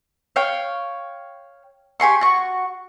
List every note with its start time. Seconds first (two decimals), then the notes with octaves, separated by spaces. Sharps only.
0.36 C#5 F5 G5
2.00 G4 G#5 C6 C#6
2.21 F#4 C#6